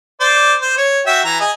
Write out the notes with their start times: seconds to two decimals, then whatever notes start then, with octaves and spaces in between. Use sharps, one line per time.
0.20 C5 D5
0.62 C5
0.78 C#5
1.06 F#4 E5 G5
1.25 E3 A#5
1.41 G#4 D#5